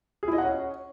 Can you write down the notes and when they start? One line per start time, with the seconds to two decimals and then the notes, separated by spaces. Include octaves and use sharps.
0.23 G#4
0.28 E4
0.33 D#5
0.38 F#5
0.43 C#4